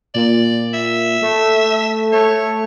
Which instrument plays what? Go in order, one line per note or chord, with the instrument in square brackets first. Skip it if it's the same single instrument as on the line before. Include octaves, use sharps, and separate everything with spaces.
[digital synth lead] A#2 [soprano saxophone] D5
[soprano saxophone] E5
[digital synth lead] A3
[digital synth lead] A3 [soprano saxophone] C#5